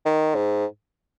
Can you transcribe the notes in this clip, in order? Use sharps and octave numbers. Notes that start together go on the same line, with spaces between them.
D#3
G#2